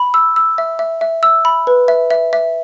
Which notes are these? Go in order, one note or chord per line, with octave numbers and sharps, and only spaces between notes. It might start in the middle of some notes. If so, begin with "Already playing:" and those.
Already playing: B5
E6
E6
E5
E5
E5
E6
B5
B4
E5
E5
E5